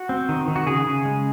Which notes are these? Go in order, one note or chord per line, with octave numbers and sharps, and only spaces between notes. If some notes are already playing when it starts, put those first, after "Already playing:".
Already playing: F#4
C4
D#3
D#3
F#4
C#3 G#4
C#3
G#3